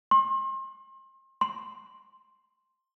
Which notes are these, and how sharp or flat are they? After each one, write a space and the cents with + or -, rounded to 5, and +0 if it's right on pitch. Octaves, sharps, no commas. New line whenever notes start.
C6 +35
C6 +5